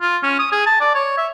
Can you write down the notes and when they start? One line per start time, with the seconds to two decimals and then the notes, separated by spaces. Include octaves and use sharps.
0.01 F4
0.23 C#4
0.39 D#6
0.52 G#4
0.66 A5
0.81 D5
0.95 C#5
1.17 E5